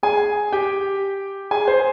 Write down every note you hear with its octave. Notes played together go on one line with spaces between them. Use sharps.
G#4 G#5
G4 G5
G#4 G#5
C5 C6